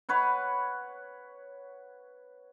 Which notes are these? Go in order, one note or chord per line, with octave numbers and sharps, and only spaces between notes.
B4 C#5 F#5 B5